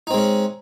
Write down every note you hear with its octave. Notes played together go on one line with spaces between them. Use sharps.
G#3 C4 C#4 D#4